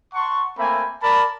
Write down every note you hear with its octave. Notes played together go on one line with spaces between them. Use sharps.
F#5 A5 C6 C#6
A3 A#3 C4 E5 G#5 B5
A#4 D5 A5 B5